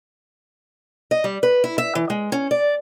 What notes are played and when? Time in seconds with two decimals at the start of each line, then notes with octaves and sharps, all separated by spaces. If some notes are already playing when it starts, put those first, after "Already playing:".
1.11 D#5
1.24 G3
1.43 B4
1.64 E4
1.78 E5
1.95 E3
2.10 G#3
2.32 C#4
2.51 D5